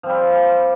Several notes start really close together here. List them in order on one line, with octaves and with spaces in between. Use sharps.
F3 C4 G3